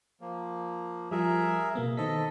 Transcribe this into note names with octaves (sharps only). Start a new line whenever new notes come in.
F3 A#3
F3 G3 G#4 A#4 E5
B2 A#3 B3
D#3 A4 C5 D#5 B6